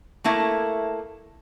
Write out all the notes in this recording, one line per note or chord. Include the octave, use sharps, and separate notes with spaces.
A3 A#3 E4